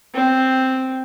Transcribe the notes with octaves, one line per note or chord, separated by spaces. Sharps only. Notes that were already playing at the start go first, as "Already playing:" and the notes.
C4